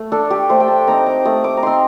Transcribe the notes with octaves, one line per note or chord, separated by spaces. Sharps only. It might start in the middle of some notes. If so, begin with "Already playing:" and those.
Already playing: A3
D4 A4
G4
A3 C5
G5
A5
C4 D#4 A#5
D6
A3 D#6
D6
A#5
C4 D#4 C6